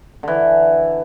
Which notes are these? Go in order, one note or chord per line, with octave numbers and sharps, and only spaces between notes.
D3 E3